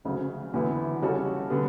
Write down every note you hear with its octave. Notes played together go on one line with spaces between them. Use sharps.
D2 C#3 F#3
E2 D3 F#3 B3 E4
C#3 G3 C#4 F#4 A4
D3 G3 B3